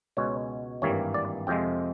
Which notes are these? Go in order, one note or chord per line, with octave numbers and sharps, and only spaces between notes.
C#2 B2 G#3 C#5
G#1 G2 E3 G3 A#3 C#5
D5
F2 C3 F3 G#3 G5